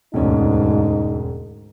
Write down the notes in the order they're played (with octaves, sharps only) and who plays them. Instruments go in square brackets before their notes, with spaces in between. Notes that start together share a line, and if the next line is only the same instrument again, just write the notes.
[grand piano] E1 C#4 [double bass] D2 G#2 [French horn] D#4